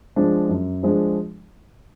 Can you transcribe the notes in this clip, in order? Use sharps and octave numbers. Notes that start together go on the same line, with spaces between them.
F3 G#3 D4
F#2
F3 G#3 D4